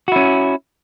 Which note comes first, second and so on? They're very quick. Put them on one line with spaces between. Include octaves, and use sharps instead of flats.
F#4 E4 C#4